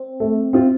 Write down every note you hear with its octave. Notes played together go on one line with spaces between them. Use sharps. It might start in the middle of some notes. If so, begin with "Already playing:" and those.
Already playing: C4
A3
C4 F4